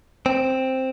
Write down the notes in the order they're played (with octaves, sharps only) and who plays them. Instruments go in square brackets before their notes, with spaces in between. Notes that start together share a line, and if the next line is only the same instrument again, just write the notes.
[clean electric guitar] C4